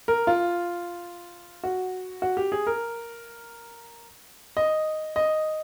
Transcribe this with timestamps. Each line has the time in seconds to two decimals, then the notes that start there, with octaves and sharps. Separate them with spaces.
0.08 A#4
0.27 F4
1.63 F#4
2.22 F#4
2.37 G4
2.52 G#4
2.67 A#4
4.57 D#5
5.16 D#5